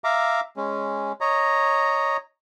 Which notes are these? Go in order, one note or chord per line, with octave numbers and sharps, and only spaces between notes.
E5 F5 A#5 D6
G#3 C#4
C#5 D#5 A#5